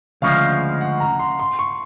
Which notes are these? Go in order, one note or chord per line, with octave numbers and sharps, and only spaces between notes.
D2 C#3 F3 G#3 F5
F#5
A#5
C6
C6
C#6